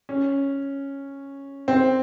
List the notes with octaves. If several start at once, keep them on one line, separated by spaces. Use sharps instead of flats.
C#4
C4